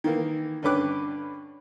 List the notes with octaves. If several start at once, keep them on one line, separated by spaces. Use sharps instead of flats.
D#3 E3 A#3
G2 D3 C#4 B4 D6 F#6